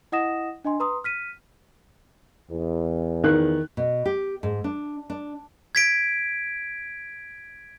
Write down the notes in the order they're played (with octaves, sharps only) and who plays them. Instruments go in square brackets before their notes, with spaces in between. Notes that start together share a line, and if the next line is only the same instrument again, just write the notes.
[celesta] E4 D#5 F#5 D#6 A#6 E7
D4 D#5 G#5 C6
B4 A#5 C6 D#6
F6 B6 D#7
[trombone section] E2
[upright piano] D#3 F#6
[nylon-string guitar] B2
G4
G#2
D4
D4
[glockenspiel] G#6 B6 D7